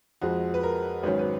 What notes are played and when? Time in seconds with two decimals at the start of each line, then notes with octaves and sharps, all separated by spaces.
0.21 F2 F3 G#3 F#4
0.54 B4
0.63 A#4
1.03 G#1 G#2 D#3 F#3 C#4 B4
1.19 B4